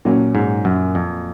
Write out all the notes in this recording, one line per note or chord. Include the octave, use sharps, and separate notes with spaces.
A#2 F#3 C#4
G#2
F#2
F2